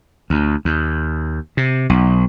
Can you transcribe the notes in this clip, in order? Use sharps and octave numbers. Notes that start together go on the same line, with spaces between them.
D2
D#2
C3
B1